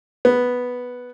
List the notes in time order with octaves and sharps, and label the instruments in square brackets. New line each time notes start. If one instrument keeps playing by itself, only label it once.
[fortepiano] B3